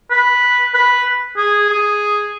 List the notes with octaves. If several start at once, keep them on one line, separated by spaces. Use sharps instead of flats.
B4
B4
G#4
G#4